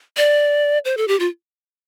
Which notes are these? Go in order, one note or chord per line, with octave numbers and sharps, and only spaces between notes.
D5
C5
A4
G4
F4